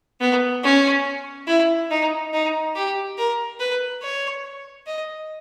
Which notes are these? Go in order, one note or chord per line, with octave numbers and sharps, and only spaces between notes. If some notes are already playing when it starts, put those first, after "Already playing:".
B3
C#4
E4
D#4
D#4
G4
A#4
B4
C#5
D#5